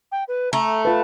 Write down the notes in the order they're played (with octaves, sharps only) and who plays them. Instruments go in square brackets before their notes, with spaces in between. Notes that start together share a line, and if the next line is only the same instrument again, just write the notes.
[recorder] G5
B4
[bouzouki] A3 [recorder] A#5
[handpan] F4 B4 [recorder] A5